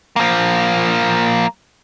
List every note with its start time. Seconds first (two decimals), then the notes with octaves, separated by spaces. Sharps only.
0.16 F3 A#3